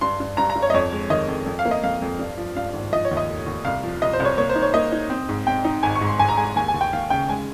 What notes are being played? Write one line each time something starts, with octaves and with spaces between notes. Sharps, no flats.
G2 C6
G2
G2 A#5
A#5
G2
C#5
D#5
F2 C#5
G#3
D#3 D#5
F2
F2
F5
A#3
D#5
F2 F5
F2
G2
F3
G2 F5
G#1
F3 D#5
C#5
D#2
D#5
F1
D#2
C2 F5
F3
C2 D#5
C5
C2
C#5
A#3 C#5
C5
D#4
C#5
A#3 D#5
D#4
C4
G#2
C4 G5
D#4
G#1 G#5
C#6
G#2
C6
G#1 G#5
A#5
G#3 G#5
D#2 G#5
G#5
D#2
G5
D#2 F5
C#3 G5
G#3 G#5